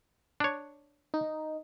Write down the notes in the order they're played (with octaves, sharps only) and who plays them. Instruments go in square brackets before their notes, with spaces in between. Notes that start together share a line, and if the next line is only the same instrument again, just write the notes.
[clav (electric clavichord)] D4 C#5
[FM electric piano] D#4